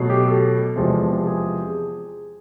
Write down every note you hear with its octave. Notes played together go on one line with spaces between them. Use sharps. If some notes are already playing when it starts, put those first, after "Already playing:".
Already playing: B2 F#3 A3
G4
A4
E2 C3 F3 G#3
G#4